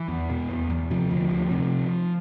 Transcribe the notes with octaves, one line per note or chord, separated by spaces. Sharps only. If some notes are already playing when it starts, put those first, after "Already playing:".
Already playing: E3
E2
B2
E2
E2
C3 F3
D2
D2
C3